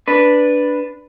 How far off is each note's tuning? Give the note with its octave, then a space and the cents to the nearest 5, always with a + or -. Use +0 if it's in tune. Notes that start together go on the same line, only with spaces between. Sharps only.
D4 +0 B4 +0